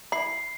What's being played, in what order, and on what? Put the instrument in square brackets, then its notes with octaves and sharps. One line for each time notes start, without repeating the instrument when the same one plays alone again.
[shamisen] E4 [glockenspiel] C7